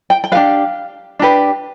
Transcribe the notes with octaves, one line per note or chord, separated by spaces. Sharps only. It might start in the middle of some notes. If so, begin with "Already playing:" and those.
G5
G5
D4 G4 B4 F5
D4 G4 B4